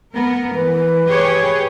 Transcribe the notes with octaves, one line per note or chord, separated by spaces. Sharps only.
B3 A#4
E3 B4
G4 G#4 C#5